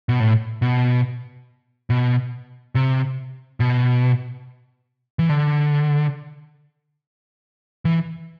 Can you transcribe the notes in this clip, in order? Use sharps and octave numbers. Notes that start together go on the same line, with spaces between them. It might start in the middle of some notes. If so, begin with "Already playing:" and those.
B2
A2
B2
B2
C3
B2
E3
D3
E3